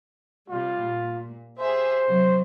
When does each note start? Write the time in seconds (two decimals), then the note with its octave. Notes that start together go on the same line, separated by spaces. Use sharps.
0.50 C3 G3 F4
0.83 A#2
1.59 G4 G#4 C5 E5
2.08 C3 F#3